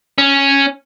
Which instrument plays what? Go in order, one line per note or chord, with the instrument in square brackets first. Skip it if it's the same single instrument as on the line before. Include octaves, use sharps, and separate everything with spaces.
[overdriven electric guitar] C#4